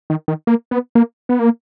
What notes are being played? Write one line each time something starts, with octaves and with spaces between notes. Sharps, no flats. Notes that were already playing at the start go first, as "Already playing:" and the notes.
D#3
D#3
A#3
B3
A#3
B3
A#3